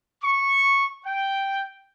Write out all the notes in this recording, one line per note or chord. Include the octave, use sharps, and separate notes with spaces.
C#6
G5